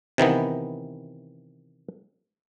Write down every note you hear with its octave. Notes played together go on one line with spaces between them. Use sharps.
C3 D#3 E3 B3